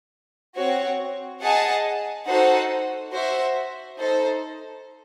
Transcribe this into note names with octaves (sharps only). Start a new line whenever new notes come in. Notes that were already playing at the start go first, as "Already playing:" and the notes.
C4 F#4 C#5
G#4 D#5 F#5 A5
D#4 F#4 A4 C5 F#5
F#4 C5 E5
D#4 A4 C5